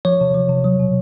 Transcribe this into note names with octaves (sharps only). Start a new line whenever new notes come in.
F3 C#5
C3
F3
C3
F#3
B2